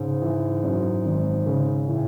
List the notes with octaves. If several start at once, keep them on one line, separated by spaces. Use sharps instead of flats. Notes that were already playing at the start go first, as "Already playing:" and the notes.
Already playing: G#2 C#3
E3
F#2
G#1
C#3
A2 E3